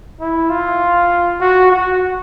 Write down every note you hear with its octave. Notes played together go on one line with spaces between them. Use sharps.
E4
F4
F#4
F#4